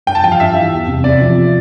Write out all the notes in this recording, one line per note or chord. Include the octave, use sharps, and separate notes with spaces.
G2 G5
A5
F3 G5
F5
G2 E5
E3
E2
C3
C3 D5
F3